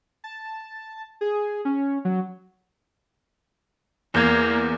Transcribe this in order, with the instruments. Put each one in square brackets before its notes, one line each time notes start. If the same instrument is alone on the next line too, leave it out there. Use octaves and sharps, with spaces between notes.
[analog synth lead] A5
G#4
C#4
F#3
[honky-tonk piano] E2 G6 G#6 [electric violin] A#3